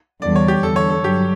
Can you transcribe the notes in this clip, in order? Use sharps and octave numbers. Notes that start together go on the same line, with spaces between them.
E2 D3 G3 D5
C#5
G4
E2 D3 G3 A4
C#5
A4
G2 F#3 G4